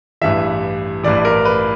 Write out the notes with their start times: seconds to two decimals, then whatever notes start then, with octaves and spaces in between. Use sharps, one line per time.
0.22 A1 G2 E3 E5
1.04 A1 G2 E3 D5
1.25 A#4
1.45 B4